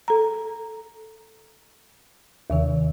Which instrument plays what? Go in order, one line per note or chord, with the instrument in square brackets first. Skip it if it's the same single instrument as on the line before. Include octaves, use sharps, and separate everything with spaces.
[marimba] A4 A#5
D#2 C3 D#3